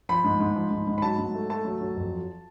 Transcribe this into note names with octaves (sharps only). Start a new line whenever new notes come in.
F3 B5
G#2
G#2
F3
G#2
G#2
B5
F#3 A5
G#2
A3
A3 A5
F#3
F#3
F2
F3